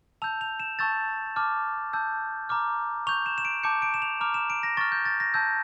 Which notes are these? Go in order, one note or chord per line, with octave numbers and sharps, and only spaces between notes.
A5 E6 G6 F7
F7
E7
A5 C#6 E6 G6 A6
A5 D6 F6
A5 E6 G6
A#5 D6 F6
C#6 G6 F7
E7
E7
D7
A5 D6 G6 C#7
D7
E7
F7
A#5 D6 F6 F7
E7
D7
A#6
C#6 F6 A6
G6
A6
A#6
A5 E6 G6